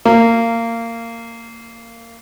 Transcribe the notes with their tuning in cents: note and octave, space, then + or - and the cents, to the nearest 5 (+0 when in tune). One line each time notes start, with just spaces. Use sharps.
A#3 -20